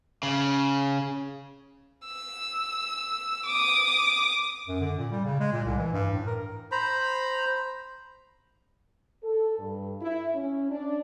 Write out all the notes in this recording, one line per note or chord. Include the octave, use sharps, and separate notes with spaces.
C#3
E6
D6 D#6
F#2
D3
A#2
G3
C#3
G#3
A#2
C2
E3
G2
A2
A#4
C5 A#5 B5
A4
G2
E4
C#4
D4